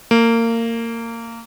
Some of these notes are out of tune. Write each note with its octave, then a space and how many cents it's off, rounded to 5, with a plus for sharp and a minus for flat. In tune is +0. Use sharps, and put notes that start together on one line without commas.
A#3 -25